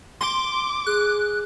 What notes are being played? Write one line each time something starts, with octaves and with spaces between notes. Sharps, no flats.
C6 D6
G#4 F#6